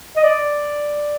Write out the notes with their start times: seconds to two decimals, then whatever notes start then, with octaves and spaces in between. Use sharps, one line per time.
0.16 D#5
0.23 D5